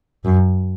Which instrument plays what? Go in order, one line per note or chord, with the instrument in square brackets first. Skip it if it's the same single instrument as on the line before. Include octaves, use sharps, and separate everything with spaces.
[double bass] F#2